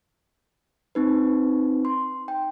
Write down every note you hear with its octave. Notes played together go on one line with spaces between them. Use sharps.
C4 D#4 B4
C6
G5